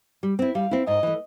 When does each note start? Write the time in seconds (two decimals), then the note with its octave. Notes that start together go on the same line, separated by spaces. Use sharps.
0.23 G3
0.39 C4 E4
0.55 G3 F5
0.71 C4 E4
0.87 G#2 D#5
1.03 E3 A3